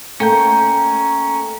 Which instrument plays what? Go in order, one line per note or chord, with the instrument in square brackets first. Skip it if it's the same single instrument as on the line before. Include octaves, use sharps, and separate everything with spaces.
[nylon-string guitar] A3 A#3 [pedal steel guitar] C#4 G5 G6 [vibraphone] A#5